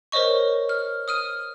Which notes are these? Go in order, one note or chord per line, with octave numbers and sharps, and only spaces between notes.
A#4 C5 C#5 D#5 C#6
F6
D#6 F6 D#7